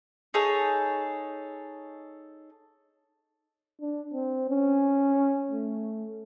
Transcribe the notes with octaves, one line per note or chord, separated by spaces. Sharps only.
D#4 G#4 A4 C#5
D4
C4
C#4
A3